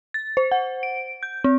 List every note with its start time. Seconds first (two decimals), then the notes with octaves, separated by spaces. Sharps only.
0.14 A6
0.37 C5
0.52 F#5
0.83 D7
1.23 G6
1.44 C4